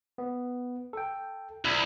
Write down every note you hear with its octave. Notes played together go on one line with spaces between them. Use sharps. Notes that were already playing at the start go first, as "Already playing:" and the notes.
B3
A4 G5
C2